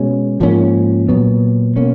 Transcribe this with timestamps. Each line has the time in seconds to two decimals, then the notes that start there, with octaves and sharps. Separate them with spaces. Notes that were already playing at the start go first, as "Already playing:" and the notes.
Already playing: B2 G#3 C#4
0.40 G#2 F3 A#3 C#4
1.09 A#2 F#3 B3
1.76 B2 A#3 C#4